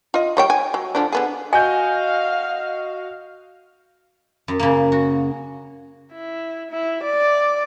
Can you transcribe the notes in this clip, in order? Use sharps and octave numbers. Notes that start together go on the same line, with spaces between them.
F4 D#5
G3 C#5 G5
G#5
F#3
D3 F3 D4
D3 B3 G#4
F#4 D#5 F5 G#5 G6
F#2
C#3 A#3
F#4
E4
E4
D5